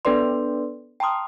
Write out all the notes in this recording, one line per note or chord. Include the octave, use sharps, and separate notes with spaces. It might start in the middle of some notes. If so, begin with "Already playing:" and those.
B3 D4 A4 B4 D5 C6
G5 A5 A#5 C6 D#6 F6